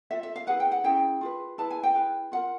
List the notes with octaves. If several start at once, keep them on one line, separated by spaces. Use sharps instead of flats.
F4 A4 E5
E5
F5
E4 G#4 B4 F#5
G5
F#5
C#4 E4 G#4 G5
F4 G#4 B4
E4 G#4 B4 A5
G#5
G5
E4 G#4 B4
F4 A#4 F#5